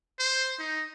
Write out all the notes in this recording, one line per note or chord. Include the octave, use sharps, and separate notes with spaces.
C5
D#4